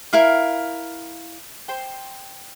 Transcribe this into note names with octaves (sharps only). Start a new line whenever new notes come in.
E4 A#4 F5
C5 G5 C6